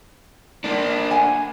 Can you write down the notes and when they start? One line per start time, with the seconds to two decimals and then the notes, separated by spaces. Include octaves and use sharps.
0.64 A#3 D4
1.11 F#5 G#5